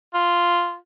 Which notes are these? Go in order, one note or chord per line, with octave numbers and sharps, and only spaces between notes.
F4